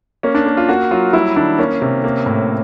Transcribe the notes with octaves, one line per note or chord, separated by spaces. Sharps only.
A#3 C#4
D4
A#3
F4
A#3 F#4
F#3 F4
G3 E4
D#3 D4
A#3 C#4
C3
A#3
A2